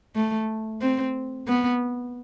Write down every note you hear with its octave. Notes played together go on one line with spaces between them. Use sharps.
A3
C4
B3